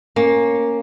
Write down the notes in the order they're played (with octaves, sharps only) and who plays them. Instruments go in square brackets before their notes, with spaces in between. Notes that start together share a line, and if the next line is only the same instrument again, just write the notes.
[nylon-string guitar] A#3 C#4